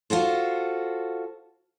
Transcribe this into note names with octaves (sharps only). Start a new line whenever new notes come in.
F4 F#4 A4 C5